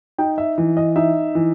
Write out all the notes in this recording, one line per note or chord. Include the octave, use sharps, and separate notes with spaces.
D#4 G5
E5
E3
D#5
D#4 E5
E3